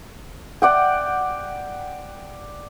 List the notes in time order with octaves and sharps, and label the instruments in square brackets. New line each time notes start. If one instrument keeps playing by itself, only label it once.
[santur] D5 F#5 G5